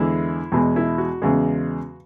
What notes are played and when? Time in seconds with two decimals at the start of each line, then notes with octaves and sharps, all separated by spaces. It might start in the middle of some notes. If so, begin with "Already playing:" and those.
Already playing: E2 D3 G#3 E4
0.52 E2 B2 G#3
0.76 E4
0.98 F#4
1.22 E2 C#3 G#3